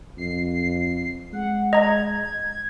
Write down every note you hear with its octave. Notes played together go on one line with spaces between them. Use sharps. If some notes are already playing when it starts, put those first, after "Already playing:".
F2 C7
G#3 F#5
D#5 A#5 G#6